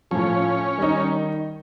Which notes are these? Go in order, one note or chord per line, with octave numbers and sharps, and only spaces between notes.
A2 F3 C#4 F4
D#3 G3 D#4